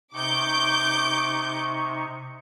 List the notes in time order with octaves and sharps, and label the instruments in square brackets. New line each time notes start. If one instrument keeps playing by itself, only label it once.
[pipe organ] C3 D#4 C#6 [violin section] D6 G6